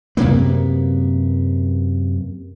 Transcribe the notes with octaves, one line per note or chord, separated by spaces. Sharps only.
F#2 C3 A#3 B3